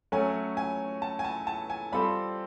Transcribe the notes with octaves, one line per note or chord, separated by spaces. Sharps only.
F#3 A3 C#4 G#5
G#5
A5
G#5
A5
A5
G#5
G3 C4 F4 A4 C5 B5